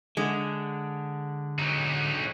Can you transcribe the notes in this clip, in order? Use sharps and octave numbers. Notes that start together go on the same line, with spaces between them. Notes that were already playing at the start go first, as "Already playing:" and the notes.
D3 G#3
F#3 D#4